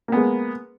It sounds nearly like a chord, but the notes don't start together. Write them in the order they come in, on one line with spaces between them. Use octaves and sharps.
A#3 B3 G#3